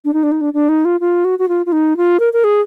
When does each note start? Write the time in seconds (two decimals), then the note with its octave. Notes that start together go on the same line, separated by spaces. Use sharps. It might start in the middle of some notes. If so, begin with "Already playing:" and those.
0.05 D4
0.14 D#4
0.23 D4
0.32 D#4
0.41 D4
0.54 D4
0.69 D#4
0.85 F4
1.00 F4
1.25 F#4
1.39 F#4
1.49 F4
1.66 F4
1.72 D#4
1.97 F4
2.20 A#4
2.33 A#4
2.44 G#4